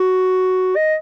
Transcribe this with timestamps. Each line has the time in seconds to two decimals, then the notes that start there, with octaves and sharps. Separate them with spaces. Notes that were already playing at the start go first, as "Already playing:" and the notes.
Already playing: F#4
0.76 D#5